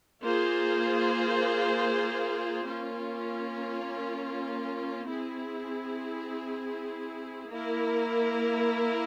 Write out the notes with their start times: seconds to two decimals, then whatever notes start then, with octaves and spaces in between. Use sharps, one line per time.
0.23 A#3 F4 G#4 C5
2.65 A#3 C#4 F4
5.07 C4 E4 G#4
7.49 A#3 E4 A#4